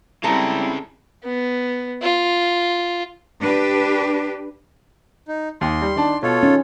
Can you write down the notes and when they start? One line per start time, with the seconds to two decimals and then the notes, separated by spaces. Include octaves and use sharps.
0.24 C#3 G3 G#3 C4 E4 A4 A#5
1.24 B3
2.02 F4
3.40 D4 G4 B4
5.28 D#4
5.61 D#2 C6
5.82 G3
5.96 D#3 D4 A5
6.23 B2 F4 A4 C#5
6.43 D#3 C#4